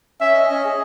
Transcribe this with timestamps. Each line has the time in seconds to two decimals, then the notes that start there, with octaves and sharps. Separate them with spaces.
0.21 C#4 E5
0.35 D#5
0.50 C#4
0.65 G#4